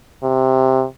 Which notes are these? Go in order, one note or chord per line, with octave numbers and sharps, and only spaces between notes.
C3